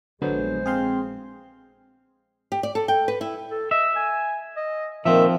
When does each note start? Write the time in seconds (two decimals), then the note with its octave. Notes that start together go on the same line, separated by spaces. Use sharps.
0.22 A#1 D3 F#3 G#3 B3 C5
0.66 C4 G#4 F5 C6
2.52 G4
2.63 D5
2.75 A4
2.88 G5
3.08 B4
3.21 E4
3.51 A4
3.71 D#5 E5
3.96 G#5
4.57 D#5
5.06 A#2 D#3 F3 C4 E5